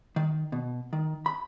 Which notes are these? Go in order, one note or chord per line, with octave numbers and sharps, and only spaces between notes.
D#3
B2
D#3
B5